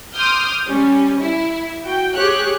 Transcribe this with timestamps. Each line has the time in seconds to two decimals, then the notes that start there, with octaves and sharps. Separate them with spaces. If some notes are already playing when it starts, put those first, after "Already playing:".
0.15 C6 D6 D#6 F6 G6
0.67 G3 C#4
1.19 E4
1.84 F#4 G5
2.15 G4 G#4 C#5 F#6